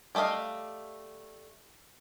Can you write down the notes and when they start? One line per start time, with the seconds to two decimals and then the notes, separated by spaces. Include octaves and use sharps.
0.15 G3 A3 C4 D#5 F5